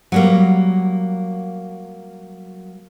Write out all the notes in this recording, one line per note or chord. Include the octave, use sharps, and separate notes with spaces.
F#3 G3 A#3